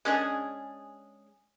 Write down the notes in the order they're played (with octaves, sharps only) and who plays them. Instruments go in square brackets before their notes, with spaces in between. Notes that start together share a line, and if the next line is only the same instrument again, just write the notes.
[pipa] G#3 C#4 D4 G#4